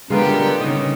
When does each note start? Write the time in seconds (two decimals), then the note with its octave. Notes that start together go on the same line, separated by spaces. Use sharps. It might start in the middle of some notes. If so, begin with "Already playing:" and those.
0.10 D3 G3 G#3 B3 F4 G4 A#4 B4
0.60 C#3 G3 C#4 D#4 D#5